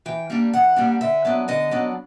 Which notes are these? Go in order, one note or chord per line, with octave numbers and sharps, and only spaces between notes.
E3 G5
G3 A#3 D4
E3 F#5
G3 A#3 D4
D3 E5
F#3 B3 D4
D3 D#5
F#3 B3 D4